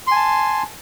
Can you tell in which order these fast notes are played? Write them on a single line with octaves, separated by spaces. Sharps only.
C6 G#5 A5